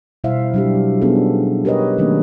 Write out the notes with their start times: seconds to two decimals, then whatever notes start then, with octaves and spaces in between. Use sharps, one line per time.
0.24 B2 G3 E4 C5 E5 F5
0.54 F#3 G3 D4 F#4 G4
1.01 B3 C#4 D4 F#4 G#4 A4
1.15 D#4
1.65 G4 A#4 B4 C#5 D#5
1.98 D#3 F#3 A3 A#3 C#4 D4